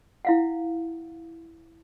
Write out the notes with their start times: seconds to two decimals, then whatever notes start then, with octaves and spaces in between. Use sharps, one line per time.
0.25 E4 F5 F#5